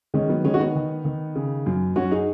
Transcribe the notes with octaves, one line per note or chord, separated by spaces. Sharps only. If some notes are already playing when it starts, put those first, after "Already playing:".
D#3 G#3 C#4
F#3 B3
D#3 G#3 C#4
F#4
B3 D#4
D#3
D#3
C#3
F#2
F#2 C#4 F#4
D#4 G#4